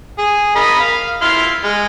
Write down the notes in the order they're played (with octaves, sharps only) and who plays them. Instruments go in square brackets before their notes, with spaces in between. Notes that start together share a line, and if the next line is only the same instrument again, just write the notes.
[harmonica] G#4
A#4 D#5 B5
F5
E4 C6 F6
G#3